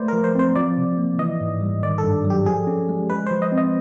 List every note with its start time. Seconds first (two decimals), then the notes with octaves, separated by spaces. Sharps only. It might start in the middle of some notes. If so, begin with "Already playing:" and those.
Already playing: A3 B4 C5 D5
0.08 F3 A#4
0.24 C5
0.35 C4 C5
0.55 F3 D5
0.77 C3
0.97 A#3
1.19 E3 D#5
1.41 G#2
1.61 G3
1.83 D#3 D5
1.98 A4
2.04 G2
2.25 F#3
2.30 G4
2.46 F3 G#4
2.67 C#4
2.89 G#3
3.10 G#3 B4
3.26 F3 C5
3.42 D#5
3.52 C4
3.57 D#5